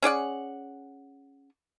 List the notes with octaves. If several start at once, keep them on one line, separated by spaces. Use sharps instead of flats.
C#4 G#4 D5 F#5